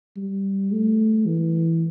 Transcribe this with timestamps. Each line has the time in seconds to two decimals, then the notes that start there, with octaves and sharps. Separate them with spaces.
0.16 G3
0.72 A3
1.27 E3